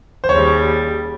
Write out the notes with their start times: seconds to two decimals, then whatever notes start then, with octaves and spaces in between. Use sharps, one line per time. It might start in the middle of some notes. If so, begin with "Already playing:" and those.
0.24 C5
0.29 D#2 C#3 G3 C#5